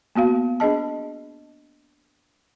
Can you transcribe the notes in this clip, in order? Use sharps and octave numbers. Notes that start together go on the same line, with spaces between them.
A#3 B3 F#4 F5
D4 G#4 D#5 A5